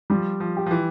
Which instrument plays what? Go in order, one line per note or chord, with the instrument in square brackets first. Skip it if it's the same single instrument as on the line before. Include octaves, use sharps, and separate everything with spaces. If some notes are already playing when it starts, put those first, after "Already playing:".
[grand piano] F3 [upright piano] G3
[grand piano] F3
[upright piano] G4
[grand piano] F3
E3